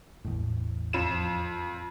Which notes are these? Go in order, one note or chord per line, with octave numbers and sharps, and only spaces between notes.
A1 E2 A2
F2 E7